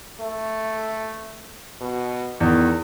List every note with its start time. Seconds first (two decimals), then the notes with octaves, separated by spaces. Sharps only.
0.20 A3
1.81 B2
2.40 E2 D#3